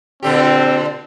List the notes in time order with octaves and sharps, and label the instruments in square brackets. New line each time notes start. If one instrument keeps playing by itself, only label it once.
[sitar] A#2 D3 G4 [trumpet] C4